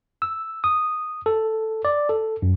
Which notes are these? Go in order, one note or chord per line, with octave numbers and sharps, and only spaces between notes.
E6
D#6
A4
D5
A4
F#2